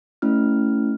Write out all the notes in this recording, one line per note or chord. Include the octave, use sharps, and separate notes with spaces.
A3 C#4 E4 F6